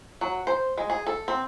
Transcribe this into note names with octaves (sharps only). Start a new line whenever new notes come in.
F#3
C5
G#3
G#4
A4
C4